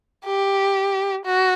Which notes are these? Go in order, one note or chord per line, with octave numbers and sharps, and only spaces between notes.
G4
F#4